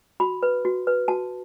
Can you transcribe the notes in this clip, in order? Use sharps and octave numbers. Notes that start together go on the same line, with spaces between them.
F#4 B5
B4
F#4
B4
F#4 A5